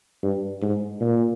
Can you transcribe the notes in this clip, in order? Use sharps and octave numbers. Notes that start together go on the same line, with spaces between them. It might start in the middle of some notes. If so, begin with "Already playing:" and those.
G2
G#2
A#2